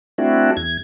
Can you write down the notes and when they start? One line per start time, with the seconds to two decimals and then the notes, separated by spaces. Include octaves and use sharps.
0.18 A3 C4 D4 E4 F#4
0.57 E2 G#6